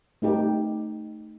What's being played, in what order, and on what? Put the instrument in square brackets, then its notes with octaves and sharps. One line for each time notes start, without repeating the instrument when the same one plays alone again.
[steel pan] A3 D#4 G4 A#4